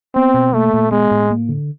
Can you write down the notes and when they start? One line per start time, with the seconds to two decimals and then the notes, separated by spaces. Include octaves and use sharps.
0.15 B3 C4
0.34 B2
0.53 A3 A#3
0.73 A#2
0.91 G#3 B3
1.11 A2
1.30 A#3
1.49 D3